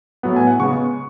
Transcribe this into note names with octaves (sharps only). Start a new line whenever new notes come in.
A2 F#3 B3 F#5
G#5
F#5
C#3 G#3 B3 C#6